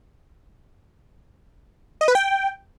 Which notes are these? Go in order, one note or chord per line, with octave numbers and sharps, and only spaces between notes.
D#5
B4
G5